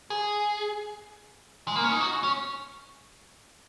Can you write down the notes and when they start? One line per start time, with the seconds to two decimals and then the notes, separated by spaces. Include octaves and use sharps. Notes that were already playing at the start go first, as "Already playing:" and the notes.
0.10 G#4
1.68 G#3
1.75 A#3
1.84 C#4
1.92 D#4
2.00 F#4
2.24 C#4